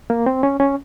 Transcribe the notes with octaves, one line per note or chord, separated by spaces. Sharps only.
A#3
C4
C#4
C#4